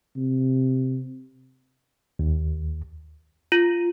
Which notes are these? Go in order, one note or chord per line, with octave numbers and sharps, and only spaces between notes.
C3
D#2
F4